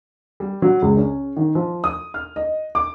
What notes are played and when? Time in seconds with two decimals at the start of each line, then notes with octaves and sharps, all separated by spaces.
0.40 G3
0.62 F#3
0.82 C#2
0.97 C#4
1.37 D#3
1.55 F3
1.84 D#6
2.14 F6
2.36 D#5
2.75 D6